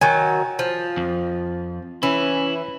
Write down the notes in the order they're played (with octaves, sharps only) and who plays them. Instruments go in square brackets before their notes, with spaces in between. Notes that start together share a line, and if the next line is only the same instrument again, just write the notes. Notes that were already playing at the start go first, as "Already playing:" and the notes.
[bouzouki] D#3 F#3 [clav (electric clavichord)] G#5
[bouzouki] F3
[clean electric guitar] F2
[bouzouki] E3 [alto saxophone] C#4 [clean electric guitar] E4